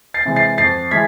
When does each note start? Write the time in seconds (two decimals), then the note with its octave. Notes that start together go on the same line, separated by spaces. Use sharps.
0.14 A6 C7
0.25 C3 E3 G#3
0.36 A6 C7
0.58 F2 A6 C7
0.91 E3 G#3 G#6 B6